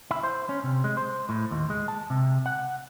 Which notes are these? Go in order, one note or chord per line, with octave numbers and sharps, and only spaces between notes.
E4
C5
C#4
C3
G#3
C5
A2
D#2
G#3
A5
C3
F#5